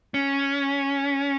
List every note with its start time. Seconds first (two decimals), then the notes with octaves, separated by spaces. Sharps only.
0.14 C#4